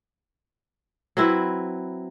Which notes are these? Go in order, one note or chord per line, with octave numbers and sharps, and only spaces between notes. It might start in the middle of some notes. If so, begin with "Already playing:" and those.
F#3 C4 E4 B4